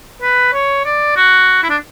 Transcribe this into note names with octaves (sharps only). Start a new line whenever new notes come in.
B4
C#5
D5
F#4
E4
D4